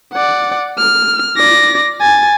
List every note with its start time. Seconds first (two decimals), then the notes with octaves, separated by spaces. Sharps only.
0.13 D5 F#5
0.78 F6
1.37 D5 A#6
2.01 G#5 A6